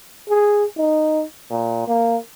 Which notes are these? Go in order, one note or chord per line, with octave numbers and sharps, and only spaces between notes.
G#4
D#4
A#2
A#3